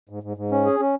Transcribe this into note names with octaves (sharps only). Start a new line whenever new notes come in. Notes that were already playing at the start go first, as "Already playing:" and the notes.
G#2
G#2
G#2
C#4
G#4
C#4